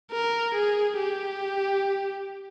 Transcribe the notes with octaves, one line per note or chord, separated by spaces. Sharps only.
A#4
G#4
G4